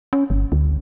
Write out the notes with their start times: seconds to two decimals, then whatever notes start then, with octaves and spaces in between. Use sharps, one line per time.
0.13 C#4
0.30 G1
0.52 D2